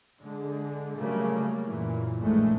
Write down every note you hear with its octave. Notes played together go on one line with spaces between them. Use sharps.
D3 G#3
C#3 F#3 G3 A3 A#3
F#2 A#2 E3
A#1 A2 G#3 A3